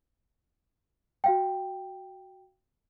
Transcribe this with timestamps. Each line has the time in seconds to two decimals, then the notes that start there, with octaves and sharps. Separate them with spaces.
1.24 F#4 F5 G5